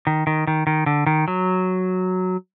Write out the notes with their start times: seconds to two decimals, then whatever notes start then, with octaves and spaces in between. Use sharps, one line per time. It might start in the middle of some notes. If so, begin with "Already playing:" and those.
0.07 D#3
0.27 D#3
0.47 D#3
0.67 D#3
0.86 D3
1.06 D#3
1.28 F#3